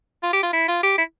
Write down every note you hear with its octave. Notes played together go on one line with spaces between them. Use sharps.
F4
G4
F4
E4
F4
G4
E4